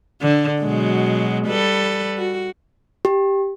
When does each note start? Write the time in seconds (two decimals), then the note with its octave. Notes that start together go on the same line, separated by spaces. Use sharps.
0.21 D3
0.60 B2 F#3 G#3
1.47 G3 A4 B4
2.17 F#4
3.05 G4